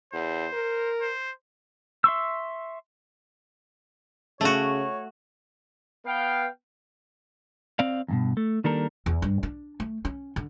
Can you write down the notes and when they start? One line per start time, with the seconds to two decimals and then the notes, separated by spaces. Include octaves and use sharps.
0.13 E2 C5
0.53 A#4
1.01 C5
2.04 E5 C6 C#6 E6
4.41 C#3 A3 F#4 C#5
6.06 B3 F5 G5
7.79 C4 D5 F5
8.08 E2 G2 B2
8.37 A3
8.64 D#3 G3 A#3 D4 A4 A#4
9.06 E2
9.22 G2
9.43 D4
9.80 A3
10.05 C#4
10.36 D3